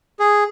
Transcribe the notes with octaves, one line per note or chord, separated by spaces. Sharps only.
G#4